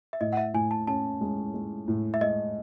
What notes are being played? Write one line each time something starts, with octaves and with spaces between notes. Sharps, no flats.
E5
A2 D#5
F#5
E5
A2 G#5
A5
C#4 A5
G#3
G#3
A2
E5
G#3 D#5